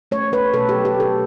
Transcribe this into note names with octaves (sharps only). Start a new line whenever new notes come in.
A3 C#5
A3 B4
B2 A4
G4
F#3
G4
A3
A4